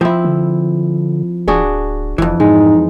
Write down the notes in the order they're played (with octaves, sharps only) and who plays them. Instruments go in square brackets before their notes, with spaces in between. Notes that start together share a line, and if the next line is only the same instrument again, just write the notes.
[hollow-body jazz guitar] F3 [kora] C4 E4
[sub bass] D3
[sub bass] D1 [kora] D4 F#4 G#4
[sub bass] F1 [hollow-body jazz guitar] F2 E3
[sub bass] G#2 [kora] G#3 [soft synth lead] D#4